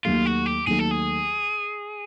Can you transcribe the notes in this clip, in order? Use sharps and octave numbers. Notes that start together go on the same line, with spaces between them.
D#2 D#3 F#3 A3 F4
F#4
G4
D#2 D#3 F#3 A3 G#4
A4
G#4